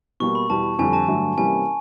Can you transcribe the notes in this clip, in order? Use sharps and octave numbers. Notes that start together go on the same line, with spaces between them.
B2 G3 A#3 C#6
B5
E2 B2 G3 A5
F2 D3 G3 G#5
A5
G2 D3 F#3 A3
C3 E3 G3 A#3 C#4 G#5